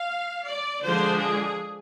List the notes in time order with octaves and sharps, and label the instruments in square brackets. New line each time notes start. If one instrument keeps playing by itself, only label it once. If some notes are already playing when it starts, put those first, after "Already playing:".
Already playing: [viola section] F5
D5
D3 F3 G#3 D4 C5
G#4